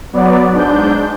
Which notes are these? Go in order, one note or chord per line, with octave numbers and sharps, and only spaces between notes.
F#3 B3 D5
G#2 D4 G6